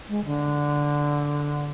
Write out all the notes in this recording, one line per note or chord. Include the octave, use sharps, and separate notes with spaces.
G#3
D3